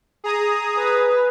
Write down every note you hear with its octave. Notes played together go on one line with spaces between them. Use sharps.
G#4 A#5 D#6
B4